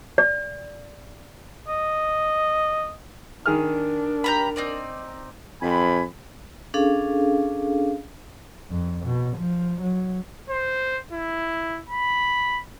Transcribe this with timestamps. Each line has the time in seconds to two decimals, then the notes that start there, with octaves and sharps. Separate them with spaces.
0.18 D5
1.68 D#5
3.46 D#3 D4 G#4 A#4 F6
4.24 G4 A#5 B5
4.56 C4 D#4 D5
5.62 F2 C4 G#5 B5
6.74 C#4 D4 G#4 A4 F5
8.70 F2
9.05 B2
9.38 F3
9.82 F#3
10.50 C5
11.12 E4
11.89 B5